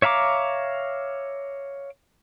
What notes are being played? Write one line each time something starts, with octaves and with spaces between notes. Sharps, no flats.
C#5 E5 F5 A#5 D6